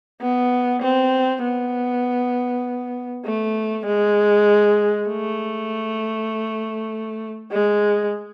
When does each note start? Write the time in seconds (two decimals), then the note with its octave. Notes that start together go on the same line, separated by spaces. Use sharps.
0.21 B3
0.82 C4
1.42 B3
3.25 A3
3.86 G#3
5.08 A3
7.51 G#3